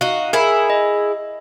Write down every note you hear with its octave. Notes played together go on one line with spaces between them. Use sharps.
D#4 F#4 F5
E4 G#4 A#4
D#5